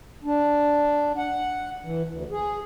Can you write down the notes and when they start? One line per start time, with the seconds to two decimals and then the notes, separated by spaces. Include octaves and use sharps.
0.24 D4
1.17 F#5
1.84 E3
2.07 D2
2.31 G#4